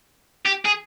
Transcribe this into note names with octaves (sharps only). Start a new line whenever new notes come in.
G4
G#4